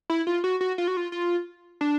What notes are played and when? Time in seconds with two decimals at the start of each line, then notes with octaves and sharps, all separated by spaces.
0.10 E4
0.27 F4
0.44 F#4
0.61 F#4
0.78 F4
0.88 F#4
0.97 F4
1.12 F4
1.81 D4